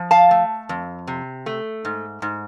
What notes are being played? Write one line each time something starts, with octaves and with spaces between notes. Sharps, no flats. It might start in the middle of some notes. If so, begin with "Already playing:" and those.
Already playing: F3
F5 A5
A3
F2
C3
A3
G#2
G#2